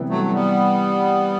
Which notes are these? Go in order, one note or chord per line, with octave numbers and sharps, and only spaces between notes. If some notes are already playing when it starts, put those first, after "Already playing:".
Already playing: C3 E3 G3 B3 E4
F#3 A3
A3
G3 B3